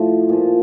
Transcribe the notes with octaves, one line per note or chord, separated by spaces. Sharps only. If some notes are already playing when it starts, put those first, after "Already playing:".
Already playing: A2 F3
A#2 F3